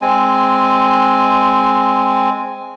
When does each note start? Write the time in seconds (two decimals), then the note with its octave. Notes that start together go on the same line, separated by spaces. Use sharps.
0.02 G#3 C4 G#5